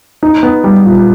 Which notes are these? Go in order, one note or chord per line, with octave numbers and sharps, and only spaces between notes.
D#4
B3
G3
A#2